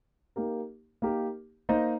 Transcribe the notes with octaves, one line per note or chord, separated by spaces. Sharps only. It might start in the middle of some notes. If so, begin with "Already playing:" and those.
A#3 D#4 G4 A#4
A#3 D#4 G4 A#4
A#3 D#4 C5 D#5